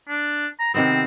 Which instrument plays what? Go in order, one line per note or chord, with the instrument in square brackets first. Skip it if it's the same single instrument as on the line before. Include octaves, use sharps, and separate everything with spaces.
[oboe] D4
A#5
[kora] C3 D#3 B3 [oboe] C4